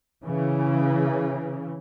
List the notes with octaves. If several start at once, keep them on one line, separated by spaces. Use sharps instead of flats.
C#3 E3